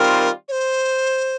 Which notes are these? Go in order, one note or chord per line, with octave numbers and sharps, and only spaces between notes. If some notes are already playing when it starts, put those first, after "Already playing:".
Already playing: D#3 G3 C4 F4 A#4
C#5
C5